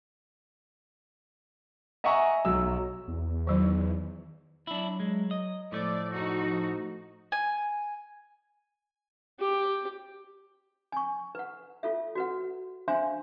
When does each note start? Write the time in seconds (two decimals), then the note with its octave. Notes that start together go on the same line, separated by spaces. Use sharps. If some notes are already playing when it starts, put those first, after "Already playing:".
2.04 D#5 E5 F#5 G#5 A#5 C#6
2.45 B1 F#3 E6
3.08 E2
3.47 D#3 F#3 D#4
4.67 F#3 D4 E4
5.00 G#3
5.31 D#5
5.72 A2 F3 A3 D5
6.12 D#4 F#4
6.46 F3
7.32 G#5
9.40 G4
10.92 G#5 C#6
11.35 B4 F#5
11.83 F4 A4 E5
12.15 F#4 B4 F#5
12.88 D4 C5 E5 F5 G#5 C6